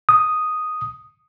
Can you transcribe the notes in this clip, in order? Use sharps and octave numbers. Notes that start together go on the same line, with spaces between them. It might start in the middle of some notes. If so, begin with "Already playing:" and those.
D#6